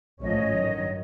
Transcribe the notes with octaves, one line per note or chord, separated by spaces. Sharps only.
A1 G#2 F3 A3 C#4 C#5 D#5
G2 D#3 F#3